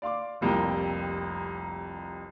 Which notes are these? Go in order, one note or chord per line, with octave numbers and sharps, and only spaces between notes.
D5 F5 C6 D6
F1 C2 F2 A#3 G5